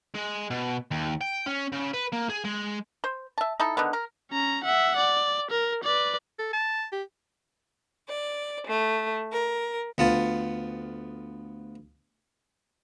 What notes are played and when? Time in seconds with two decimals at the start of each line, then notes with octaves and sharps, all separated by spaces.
0.15 G#3
0.50 B2
0.91 D#2
1.21 G5
1.46 C#4
1.72 C#3
1.93 B4
2.12 A#3
2.29 G#4
2.44 G#3
3.04 C5
3.38 E5 A5
3.60 D#4 E4 A4
3.77 D3 D#3 B3
3.93 A#4
4.31 C#4 A#5
4.64 E5 F#5
4.96 D5
5.51 A#4
5.84 B4 D5
6.39 A4
6.53 A5
6.92 G4
8.09 D5
8.67 A3
9.32 A#4
9.98 D2 B3 F4 A5